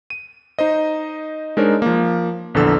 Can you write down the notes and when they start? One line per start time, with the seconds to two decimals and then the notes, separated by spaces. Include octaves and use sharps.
0.10 D#7
0.59 D#4 C5 D#5
1.57 G#3 D4 D#4 A#4 C5 C#5
1.82 F3 A#3
2.54 A#1 E2 D3 A4 E6